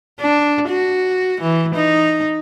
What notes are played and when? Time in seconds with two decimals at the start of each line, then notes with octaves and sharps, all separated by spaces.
0.20 D4
0.69 F#4
1.41 E3
1.75 D#4